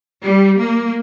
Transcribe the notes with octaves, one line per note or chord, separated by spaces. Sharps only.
G3
A#3